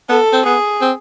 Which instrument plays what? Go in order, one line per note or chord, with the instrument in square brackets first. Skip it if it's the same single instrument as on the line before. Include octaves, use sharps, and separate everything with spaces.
[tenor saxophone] B3 [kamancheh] A4
[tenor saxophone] C4
[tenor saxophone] B3 [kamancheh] G#4
[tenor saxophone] C4